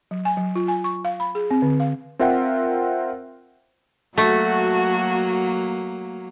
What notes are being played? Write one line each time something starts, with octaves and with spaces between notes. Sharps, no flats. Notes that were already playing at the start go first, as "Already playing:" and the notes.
F#3
G#5
F#3
F4
G#5
C#6
F5
B5
G#4
C4
D3
F5
C4 F4 A#4 E5 F#5 G5
F#3 A3 A#3 F#4